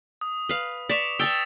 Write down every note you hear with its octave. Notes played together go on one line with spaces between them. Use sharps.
D#6
B4 F5
D5 C#6 B6 E7 F7
G5 A5 C#6 D#6 E6 A6